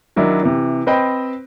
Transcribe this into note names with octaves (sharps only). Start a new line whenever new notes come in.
D#3 F#3 D4 E4
C3 E3
C4 B4 C5 D#5 G5 B5